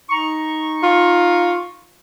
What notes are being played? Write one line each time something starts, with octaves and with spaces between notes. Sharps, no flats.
D#4 A#5 C#6
F4